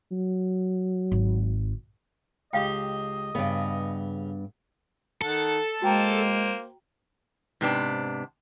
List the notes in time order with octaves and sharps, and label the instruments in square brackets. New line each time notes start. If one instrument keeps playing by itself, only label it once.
[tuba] F#3
[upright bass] G#1
[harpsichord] C#2 G4 C6 [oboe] D#5 [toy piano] F5 G5
[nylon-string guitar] G2 B3 [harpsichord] C#3
[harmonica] D#3 F#5 [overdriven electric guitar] A4
[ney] G#3 [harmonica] A#3 C5 [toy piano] F#4 G5 A#5
[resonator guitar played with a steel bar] G#2 C3 B3 D4